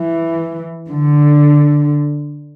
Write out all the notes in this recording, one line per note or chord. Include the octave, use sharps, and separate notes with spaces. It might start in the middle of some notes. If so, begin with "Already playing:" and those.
Already playing: E3
D3